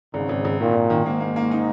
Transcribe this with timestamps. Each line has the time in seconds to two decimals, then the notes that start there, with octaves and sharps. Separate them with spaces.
0.14 G#1 G#2 C#3
0.29 G#1
0.45 G#1
0.60 A#2 D#3
0.75 G#1
0.90 D#3
1.06 G#2 A#3
1.20 A#3
1.36 A#3
1.51 D#4